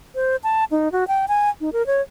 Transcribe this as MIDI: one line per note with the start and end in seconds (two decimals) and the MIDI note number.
0.15 0.36 72
0.44 0.64 81
0.71 0.91 63
0.92 1.07 66
1.08 1.26 79
1.28 1.49 80
1.61 1.70 63
1.73 1.85 70
1.87 2.01 73